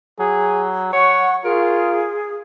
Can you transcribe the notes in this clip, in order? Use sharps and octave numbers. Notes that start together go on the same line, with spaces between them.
F#3 G#4
C#5 F#5 C#6
F4 G#4 A#4